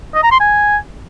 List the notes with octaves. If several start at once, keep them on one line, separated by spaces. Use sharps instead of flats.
D#5
A#5
C6
G#5